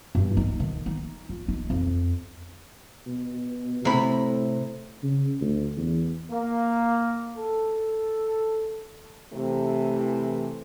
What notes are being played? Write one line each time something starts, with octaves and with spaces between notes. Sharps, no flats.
G2
D#4
D#3
D#4
F4
D#4
F2
B2
A2 C3 B5
C#3
D2
E2
A#3
A4
C3 E3 A3